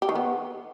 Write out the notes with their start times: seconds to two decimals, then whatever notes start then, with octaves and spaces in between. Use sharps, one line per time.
0.02 G4
0.09 D#3
0.15 B3